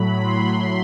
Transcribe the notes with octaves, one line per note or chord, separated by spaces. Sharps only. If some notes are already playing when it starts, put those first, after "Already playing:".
Already playing: A2 F#3 B5
C6